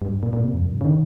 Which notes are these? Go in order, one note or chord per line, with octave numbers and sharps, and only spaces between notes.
G2
A#2
A#2
C3
F2
G2
C3
C#3
D#3